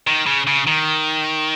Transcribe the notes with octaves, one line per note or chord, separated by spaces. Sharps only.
D#3
C#3
C#3
D#3